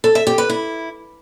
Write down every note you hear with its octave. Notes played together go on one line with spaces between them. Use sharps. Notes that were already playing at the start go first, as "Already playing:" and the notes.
A4
E5
G4
B4
E4